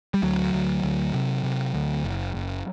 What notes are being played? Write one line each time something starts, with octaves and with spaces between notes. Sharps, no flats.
G3
D2 F#3
D2
D2
C3
C3
D2
F#1
F#1